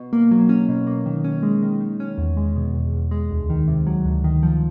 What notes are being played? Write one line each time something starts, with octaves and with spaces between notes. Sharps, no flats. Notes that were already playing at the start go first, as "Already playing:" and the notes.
Already playing: B2
A#3
F#3
C#4
B2
A#3
D#3
C#4
G#3
D#3
D#3
C#4
E2
G#3
B2
E2
E2
G#3
D2
D#3
C3
F#3
D2
D#3
F3